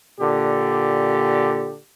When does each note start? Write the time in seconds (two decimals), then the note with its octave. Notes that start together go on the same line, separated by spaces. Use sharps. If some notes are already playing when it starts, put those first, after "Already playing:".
0.19 A#2 D3 G4